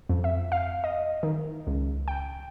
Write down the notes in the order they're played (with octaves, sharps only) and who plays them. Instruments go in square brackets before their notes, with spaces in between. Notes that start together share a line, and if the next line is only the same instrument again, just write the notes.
[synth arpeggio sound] F2
E5
F5
D#5
D#3
C#2
G5